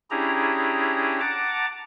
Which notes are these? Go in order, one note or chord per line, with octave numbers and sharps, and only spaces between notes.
C#4 D4 E4 G4 G#4 A#5
F#5 A5 A#5 D6